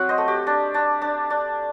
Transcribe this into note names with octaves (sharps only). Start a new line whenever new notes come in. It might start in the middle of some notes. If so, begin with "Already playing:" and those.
Already playing: F#3 C4 F#5
C5 D#5
A3
G4
D4
D4
D4
D4